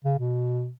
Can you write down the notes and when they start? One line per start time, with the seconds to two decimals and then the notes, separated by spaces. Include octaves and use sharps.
0.04 C#3
0.19 B2